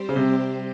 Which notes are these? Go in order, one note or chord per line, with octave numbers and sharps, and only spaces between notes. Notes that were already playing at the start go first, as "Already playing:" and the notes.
Already playing: G3 C4 G4 C5
C#3
C3